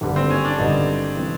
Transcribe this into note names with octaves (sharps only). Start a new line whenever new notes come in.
G#1 G2 D3 G3
C4
C#4
D4
G#1 G2 D3 G3 D#4
C3 E3 G#3 C4